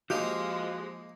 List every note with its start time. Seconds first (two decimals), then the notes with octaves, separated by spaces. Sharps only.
0.10 F3 G#3 A#3 D#4 F#4 G4 F5 D#6